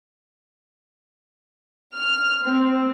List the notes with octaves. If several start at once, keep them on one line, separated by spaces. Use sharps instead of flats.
F6
C4